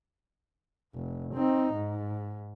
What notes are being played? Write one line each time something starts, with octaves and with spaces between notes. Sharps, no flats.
F1
C4 D#4
G#2